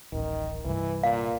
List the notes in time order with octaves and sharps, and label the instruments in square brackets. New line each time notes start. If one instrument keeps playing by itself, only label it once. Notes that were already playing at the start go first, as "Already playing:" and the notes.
[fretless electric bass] D1 A1 [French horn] D#3
[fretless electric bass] C2 G2 [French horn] E3
[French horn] A#2 [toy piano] F5